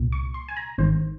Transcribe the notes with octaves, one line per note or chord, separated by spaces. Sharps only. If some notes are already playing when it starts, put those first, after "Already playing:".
Already playing: C2 A#2
C#6
C6
G#5
A#5
G#1 G#2 D#3 C5